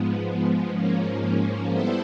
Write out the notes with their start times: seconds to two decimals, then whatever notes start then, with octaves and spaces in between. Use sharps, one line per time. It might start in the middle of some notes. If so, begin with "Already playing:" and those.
Already playing: G#2 F3 G#3 B3
0.70 G#2 F3 A#3 C#4
1.71 G3 B3 E4 A4 C5